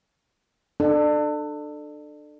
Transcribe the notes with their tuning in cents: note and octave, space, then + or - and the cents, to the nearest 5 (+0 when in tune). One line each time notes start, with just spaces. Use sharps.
D4 +30 A4 +0